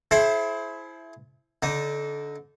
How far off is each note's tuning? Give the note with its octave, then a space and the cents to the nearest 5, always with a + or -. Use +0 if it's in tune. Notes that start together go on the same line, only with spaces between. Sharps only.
E4 +5 G#4 +45 C5 +10
D3 -25 D#4 +0